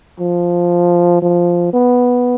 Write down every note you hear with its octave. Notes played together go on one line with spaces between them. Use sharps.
F3
F3
B3